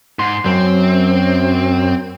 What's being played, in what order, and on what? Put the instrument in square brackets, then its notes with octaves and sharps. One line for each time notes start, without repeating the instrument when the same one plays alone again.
[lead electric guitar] G#2 [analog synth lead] C6
[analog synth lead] F#2 [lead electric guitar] C4